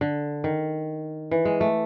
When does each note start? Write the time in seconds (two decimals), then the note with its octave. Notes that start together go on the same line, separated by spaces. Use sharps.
0.01 D3
0.44 D#3
1.31 E3
1.45 G#3
1.61 A3